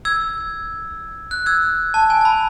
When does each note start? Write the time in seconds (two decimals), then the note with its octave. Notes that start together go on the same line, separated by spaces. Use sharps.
0.05 E6 G#6
1.31 F#6
1.46 E6 G#6
1.94 A5
2.10 G#5
2.21 A5
2.25 B5